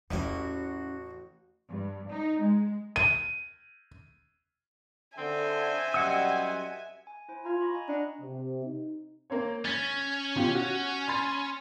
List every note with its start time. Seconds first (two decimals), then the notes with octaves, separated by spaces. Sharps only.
0.11 A1 E2 E3 C#4 E4 F#4 G4 G#5
1.69 G2
2.09 D#4
2.40 G#3
2.96 D#7
5.18 D3 C4 E5 G#5
5.94 F#2 G3 C4 D#5 F#5 E6
7.07 G#5
7.28 E4 C5 G#5
7.45 F4 A#5 G#6
7.61 B5 C#6 A#6
7.73 D#5 G#5 A#5
7.88 D4 D#5 F#5 A#5
8.20 C3
8.63 D#4
9.30 A#3 C4 C#5
9.65 C#4 A6 B6
10.36 B2 F4 G4
10.55 F#4
11.08 B5 C6 A6